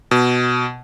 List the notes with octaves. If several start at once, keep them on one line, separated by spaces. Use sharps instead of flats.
B2